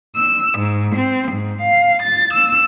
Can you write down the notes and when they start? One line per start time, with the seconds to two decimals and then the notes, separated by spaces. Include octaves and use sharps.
0.15 E6
0.58 G#2
0.95 C4
1.30 G#2
1.61 F5
2.02 A6
2.33 E6